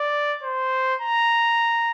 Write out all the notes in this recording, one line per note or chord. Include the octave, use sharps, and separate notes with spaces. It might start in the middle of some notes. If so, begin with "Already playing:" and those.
Already playing: D5
C5
A#5